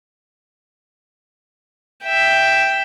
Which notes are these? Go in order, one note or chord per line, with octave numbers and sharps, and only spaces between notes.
E5 G5